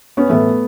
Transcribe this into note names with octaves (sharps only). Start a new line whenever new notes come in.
B3 C#4
A2 E3 A3 B3